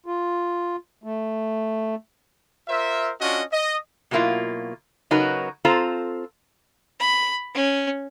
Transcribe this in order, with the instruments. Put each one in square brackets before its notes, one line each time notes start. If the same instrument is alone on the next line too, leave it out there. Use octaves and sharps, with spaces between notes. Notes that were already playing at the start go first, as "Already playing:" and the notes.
[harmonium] F4
A3
[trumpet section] F4 A#4 C5 E5
C#4 D4 F4 F#4 D#5
D#5
[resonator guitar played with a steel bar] B2 F#3 A3 A#3 E4 F4
C#3 F#3 D#4 F#4 A#4 B4
C4 F4 A4 C5 A#5
[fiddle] B5
C#4